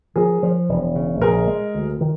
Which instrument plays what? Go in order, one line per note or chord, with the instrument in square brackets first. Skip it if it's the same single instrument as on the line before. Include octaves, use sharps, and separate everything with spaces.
[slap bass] F3 [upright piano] G#4 A#4
[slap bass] F3
E1
C#3
[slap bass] A#1 [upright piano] G#4 A#4
[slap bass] G#3
D2
D#3